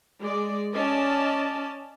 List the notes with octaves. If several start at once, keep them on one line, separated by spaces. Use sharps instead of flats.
G#3 D5
C#4 D5 D#5 A5